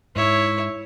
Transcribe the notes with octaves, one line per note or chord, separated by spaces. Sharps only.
G#2 E4 C#5